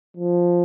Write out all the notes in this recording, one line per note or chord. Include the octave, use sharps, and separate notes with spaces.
F3